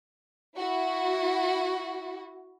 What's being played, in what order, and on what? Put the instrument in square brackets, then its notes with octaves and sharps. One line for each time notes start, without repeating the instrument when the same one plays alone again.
[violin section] E4 F#4